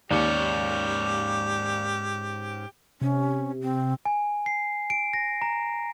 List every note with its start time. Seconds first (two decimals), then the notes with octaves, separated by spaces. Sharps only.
0.11 D#2 G#2 C#4 G4 D5
3.01 C3 C#4
3.62 C4
4.05 G#5
4.46 C7
4.90 D7
5.13 A#6
5.42 A#5